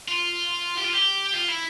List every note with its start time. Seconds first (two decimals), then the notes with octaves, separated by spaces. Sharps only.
0.08 F4
0.77 G4
0.85 F4
0.93 G4
1.33 F4
1.49 E4